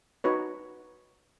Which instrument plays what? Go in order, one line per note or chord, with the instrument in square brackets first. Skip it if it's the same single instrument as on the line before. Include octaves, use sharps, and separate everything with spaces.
[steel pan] D#4 F#4 B4 C#5